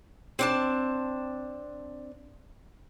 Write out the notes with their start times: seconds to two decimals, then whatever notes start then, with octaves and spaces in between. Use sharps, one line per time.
0.39 C4 D4 A5